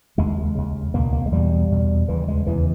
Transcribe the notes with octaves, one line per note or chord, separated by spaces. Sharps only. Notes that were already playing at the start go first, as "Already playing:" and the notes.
D#2 C#3 G#3
D#2 C#3
C#2 B2 A#3
A#3
G#3
E2 B2 G3
E2 B2
D#2 C#3 E3
G#3
E2 C#3 E3